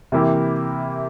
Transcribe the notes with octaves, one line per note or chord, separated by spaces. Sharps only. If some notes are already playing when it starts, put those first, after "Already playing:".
C3 E3 A#3 E4 G4